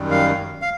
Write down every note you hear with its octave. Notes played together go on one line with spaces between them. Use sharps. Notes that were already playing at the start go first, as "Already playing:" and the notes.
Already playing: F#2 D#3 G3
F5
F5